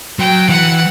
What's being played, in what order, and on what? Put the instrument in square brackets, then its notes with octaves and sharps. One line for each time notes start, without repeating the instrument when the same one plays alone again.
[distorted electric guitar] F#3 [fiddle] G5
[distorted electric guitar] E3 [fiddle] F#5